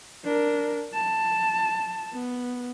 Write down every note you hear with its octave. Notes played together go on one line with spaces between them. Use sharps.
D4 A#4
A5
B3